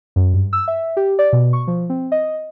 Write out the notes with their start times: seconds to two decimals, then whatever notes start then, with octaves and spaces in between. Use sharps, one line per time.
0.16 F#2
0.34 G2
0.53 E6
0.68 E5
0.97 G4
1.19 D5
1.33 B2
1.53 C#6
1.67 F3
1.90 C4
2.12 D#5